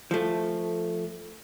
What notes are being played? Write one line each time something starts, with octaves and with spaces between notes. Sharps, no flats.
F3 A3